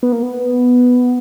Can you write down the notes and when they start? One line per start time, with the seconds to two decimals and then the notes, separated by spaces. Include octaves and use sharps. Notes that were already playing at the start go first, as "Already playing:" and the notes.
0.03 B3
0.12 A#3
0.23 B3